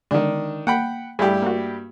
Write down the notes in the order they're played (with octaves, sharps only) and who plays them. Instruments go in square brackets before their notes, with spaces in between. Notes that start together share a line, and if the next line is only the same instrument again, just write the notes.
[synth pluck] D3 G#3 [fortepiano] D#3 D4
[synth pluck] A#3 [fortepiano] F#5 G5 B5
[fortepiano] G2 E4 G4 [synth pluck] A3 G#4
[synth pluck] A#3 F#4